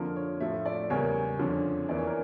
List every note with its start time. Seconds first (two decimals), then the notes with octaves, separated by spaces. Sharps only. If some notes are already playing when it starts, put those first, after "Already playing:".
Already playing: F2 D3 F3 A#3 A#4
0.16 C#5
0.41 A2 F3 A3 E5
0.66 D5
0.90 E2 C#3 G3 A#3 C#5
1.39 F2 D3 F3 C#4
1.89 E2 E3 A#3 C#4 D5
1.98 C#5
2.07 A#4